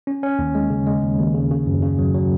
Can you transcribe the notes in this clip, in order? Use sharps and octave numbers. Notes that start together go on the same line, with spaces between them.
C#4
C#4
D#2
G#3
C#3
G#3
D#2
D#2
C#3
C#3
F#2
C#3
F#3
F#3